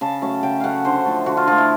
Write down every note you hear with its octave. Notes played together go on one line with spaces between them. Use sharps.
C#3 A5
F#3 A3 C#4
C#3 G5
F#3 A3 C#4 F5 F#5
D3 C5
F3 A3
D3 F#4
F4
F3 A3 F4
E4